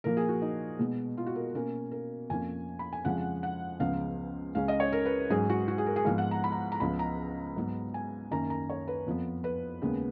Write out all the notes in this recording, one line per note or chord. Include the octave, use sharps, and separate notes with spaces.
A#2 F3 A#3 A#4
G#4
F#4
D#4
B2 G#3 B3
F4
F#4
A#4
B2 A#3 C#4 A#4
A#4
F2 F3 A#3 C#4 G#5
B5
G#5
F2 C#3 F3 G#3 C#4 F#5
F#5
C#2 C#3 F3 B3 F5
C#2 C#3 G#3 C#4 F5
D#5
C#5
A#4
B4
G#2 F#3 C#4 G#4
F#4
F#4
G#4
A#4
G#4
G#2 F3 B3 F5
F#5
A#5
B5
A#5
A#5
C#2 C#3 F3 B3 B5
A#5
G#2 F#3 B3
G#5
F#2 D#3 A#3 C#4 A#5
A#5
C#5
B4
F2 F3 B3
B4
D#2 C#3 G#3 B3